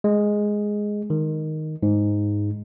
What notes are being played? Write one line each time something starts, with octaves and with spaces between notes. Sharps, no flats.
G#3
D#3
G#2